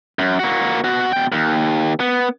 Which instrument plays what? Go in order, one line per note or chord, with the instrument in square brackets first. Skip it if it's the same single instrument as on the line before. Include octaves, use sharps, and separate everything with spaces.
[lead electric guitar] F#2
A#3 F#4
B2 F#4
B2 G5
D#2
B3